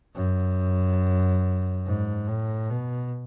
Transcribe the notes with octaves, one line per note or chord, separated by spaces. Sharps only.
F#2
G#2
A2
B2